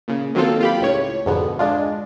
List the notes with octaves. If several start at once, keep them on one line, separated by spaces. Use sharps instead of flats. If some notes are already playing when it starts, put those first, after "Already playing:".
A#2 C#3
D#3 F#3 A#3 C4 F4 A4
F4 G4 B5
C#2 A2 C#5
F2 G#2 B2 D3 B3
G#3 D4 F4